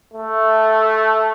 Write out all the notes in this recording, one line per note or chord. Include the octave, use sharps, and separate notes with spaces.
A3